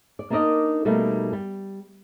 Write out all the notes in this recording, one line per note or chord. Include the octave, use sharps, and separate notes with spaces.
D5
A#3 D4 D#4 A#4 D5 D#5
B2 G3 A3 A#3 D#4
G3